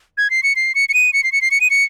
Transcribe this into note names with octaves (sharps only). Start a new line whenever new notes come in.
G#6
C7
C#7
C7
C#7
C#7
D#7
C#7
C7
C#7
C7
C#7
D#7
C#7